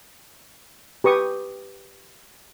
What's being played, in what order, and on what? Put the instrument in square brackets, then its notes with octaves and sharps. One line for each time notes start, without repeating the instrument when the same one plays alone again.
[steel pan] G4 B4 C#6 D#6